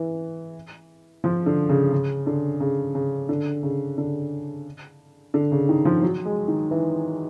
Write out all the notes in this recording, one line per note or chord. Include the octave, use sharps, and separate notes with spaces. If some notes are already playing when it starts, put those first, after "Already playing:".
Already playing: E3
F3
D3
C#3
C#3
D3
C#3
C#3
D3
C#3
D3
D3
C#3
D#3
F3
F#3
G#3
D#3
E3